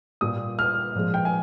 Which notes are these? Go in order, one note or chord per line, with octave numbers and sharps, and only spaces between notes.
A#2 G3 D#6
F6
A#2 F3 G#3
G5
G#5